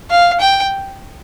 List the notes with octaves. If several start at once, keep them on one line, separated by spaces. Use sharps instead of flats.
F5
G5